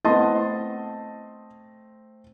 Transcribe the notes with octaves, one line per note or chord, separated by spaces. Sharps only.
A3 B3 C4 E4 D#5 A5 C6 A6